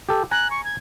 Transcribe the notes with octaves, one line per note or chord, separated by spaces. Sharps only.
G4 A4
G#5 A#5 F#6
C#6
G#6